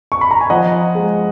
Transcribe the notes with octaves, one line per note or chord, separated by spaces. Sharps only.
C#6
B5
A#5
G#5
F3 D#5 F#5
G#3